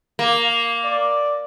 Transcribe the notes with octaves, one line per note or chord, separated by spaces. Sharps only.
A#3
D5